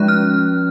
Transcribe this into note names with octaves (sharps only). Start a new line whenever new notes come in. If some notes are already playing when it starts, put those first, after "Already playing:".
Already playing: F3 G#3 C#4 F#6
F6